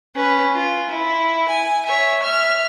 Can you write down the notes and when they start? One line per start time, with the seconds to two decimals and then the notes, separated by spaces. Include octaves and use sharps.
0.15 C#4 B4
0.54 F4
0.89 E4
1.48 G#5
1.85 C#5 E5
2.23 E5 F6